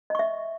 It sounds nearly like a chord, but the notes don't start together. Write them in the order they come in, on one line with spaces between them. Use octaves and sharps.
D#5 C#6 E5